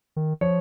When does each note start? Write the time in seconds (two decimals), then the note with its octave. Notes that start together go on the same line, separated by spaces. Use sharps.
0.16 D#3
0.41 F3 C#5